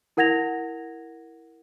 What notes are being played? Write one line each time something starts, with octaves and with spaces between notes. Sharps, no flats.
E4 A#4 F#5 G#6 A#6 F7